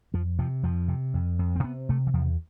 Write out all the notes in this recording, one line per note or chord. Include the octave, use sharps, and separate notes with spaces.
F2 F3
C3 F3
F2 F3
C3
F2
F2
C4
C3 B3
C3 A3
E3
E2 F3